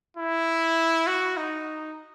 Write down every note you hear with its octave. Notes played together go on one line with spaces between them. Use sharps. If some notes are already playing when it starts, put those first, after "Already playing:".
E4
F#4
D#4